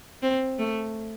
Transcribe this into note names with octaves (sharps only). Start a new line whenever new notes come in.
C4
A3